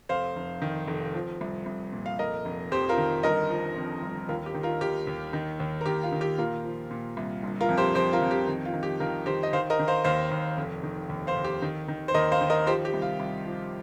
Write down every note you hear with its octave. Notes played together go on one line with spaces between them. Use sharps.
F1 C5 F5
F1
D#3
F1
F3
C2
C2
A#2
F5
F1 A#4 D#5
F1
F2 G4 C5
F4 A#4
D#3
G1 A#4 D#5
F3
F2
G1
D#2 F4 A#4
G4
D#3
F4 A#4
D#2 G4
D#2
D#3
D#2
A#4
D#2 G4
F4
D#3
G4
A#2 F4 A#4
F3
A#2
C2
G1
F4 A#4
F2
G4 C5
F2 G4 C5
F4 A#4
F2
G4
D#3
F4
D#3
G4
D#3 F4 A#4
D#3 G4 C5
D#5
D#3 C5 F5
A#4 D#5
D#3
C5 F5
D#2 C5 F5
D#2
F1
D#3
D#2
C5 F5
D#2
G4
D#3
D#3
C5
D#2 A#4 D#5
C5 F5
D#3
A#4 D#5
F3 G4 C5
G4
C2
F4
C2
F3